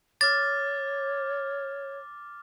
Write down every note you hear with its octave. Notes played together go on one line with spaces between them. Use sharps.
C#5 D6 F6 A6